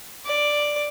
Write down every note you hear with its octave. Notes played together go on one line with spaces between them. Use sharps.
D5